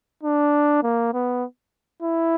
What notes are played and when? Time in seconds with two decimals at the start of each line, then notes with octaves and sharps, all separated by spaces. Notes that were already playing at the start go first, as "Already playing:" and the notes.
0.23 D4
0.83 A#3
1.13 B3
2.02 E4